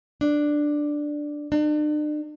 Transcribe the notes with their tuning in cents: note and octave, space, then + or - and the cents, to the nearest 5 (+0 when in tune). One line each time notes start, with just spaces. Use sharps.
D4 +5
D4 +40